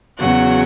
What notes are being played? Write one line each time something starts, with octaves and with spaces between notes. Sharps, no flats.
E2 C#3 F#3 F#4 F#5